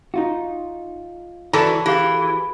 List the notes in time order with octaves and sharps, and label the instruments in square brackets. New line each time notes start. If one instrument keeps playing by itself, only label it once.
[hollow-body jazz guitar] D#4 F4 F#4
[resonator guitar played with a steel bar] E3 [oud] F#4 A4 B4 [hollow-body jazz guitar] D5 A5 A#5
[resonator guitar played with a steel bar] E3 [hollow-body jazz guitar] G4 G#4 F5